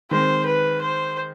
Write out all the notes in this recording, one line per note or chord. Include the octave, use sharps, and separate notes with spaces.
D#3 G#3 C4 C5
B4
C5